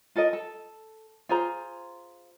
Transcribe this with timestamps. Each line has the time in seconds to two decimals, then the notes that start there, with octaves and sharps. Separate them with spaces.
0.16 F4 A4 A#4 D#5
0.33 A4
1.29 F4 G#4 C5 A#5